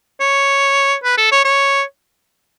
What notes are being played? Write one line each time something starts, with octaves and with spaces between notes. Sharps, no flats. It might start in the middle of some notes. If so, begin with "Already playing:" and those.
C#5
B4
A4
C#5
C#5